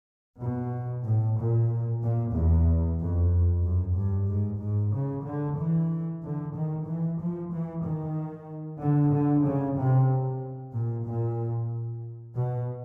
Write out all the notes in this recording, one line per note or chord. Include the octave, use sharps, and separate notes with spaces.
B2
A2
A#2
A#2
E2
F2
F#2
G2
G#2
G#2
C#3
D3
E3
D3
D#3
E3
F3
E3
D#3
D3
D3
C#3
C3
A#2
A#2
B2